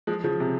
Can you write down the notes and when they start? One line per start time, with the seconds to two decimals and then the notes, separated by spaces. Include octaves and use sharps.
0.07 F3 G#3
0.24 C#3 F3
0.40 C3